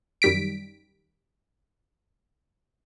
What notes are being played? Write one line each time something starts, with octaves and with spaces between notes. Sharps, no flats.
F#2 D#3 G3 B6 D7